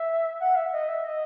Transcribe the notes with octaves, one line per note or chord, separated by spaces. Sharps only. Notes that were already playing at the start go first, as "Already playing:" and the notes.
Already playing: E5
F#5
E5
D#5
E5
D#5